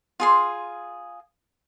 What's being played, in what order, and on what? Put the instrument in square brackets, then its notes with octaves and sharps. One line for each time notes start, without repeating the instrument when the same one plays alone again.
[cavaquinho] F4 G#4 C6